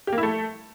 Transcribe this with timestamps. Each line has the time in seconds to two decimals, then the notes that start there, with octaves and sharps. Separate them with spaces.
0.07 G4
0.13 A#3
0.18 E4
0.23 A3